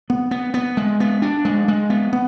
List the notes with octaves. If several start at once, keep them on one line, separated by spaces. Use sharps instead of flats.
B3
B3
B3
G#3
B3
D4
G#3
G#3
B3
B3